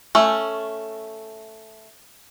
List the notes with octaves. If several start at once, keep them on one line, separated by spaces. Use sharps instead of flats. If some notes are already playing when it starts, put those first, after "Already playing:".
A3 C#4